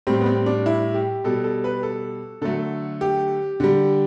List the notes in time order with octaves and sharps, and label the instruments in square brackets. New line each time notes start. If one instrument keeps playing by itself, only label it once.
[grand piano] A2 G3 C4
B3
C4
D4
E4
G4
B2 G3 A4
A4
B4
A4
D3 F#3 A3 A4
G4
D3 G3